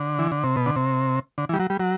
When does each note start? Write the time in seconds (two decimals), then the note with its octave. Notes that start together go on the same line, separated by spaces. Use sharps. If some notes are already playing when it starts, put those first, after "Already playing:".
Already playing: D3
0.19 E3
0.31 D3
0.44 C3
0.56 B2
0.66 D3
0.76 C3
1.38 D3
1.49 E3
1.53 G3
1.59 F#3
1.70 G3
1.80 F#3